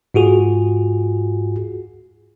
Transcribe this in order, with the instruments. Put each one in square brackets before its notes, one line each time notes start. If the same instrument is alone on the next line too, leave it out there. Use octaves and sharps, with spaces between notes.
[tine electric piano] G#2 F4 F#4 G#4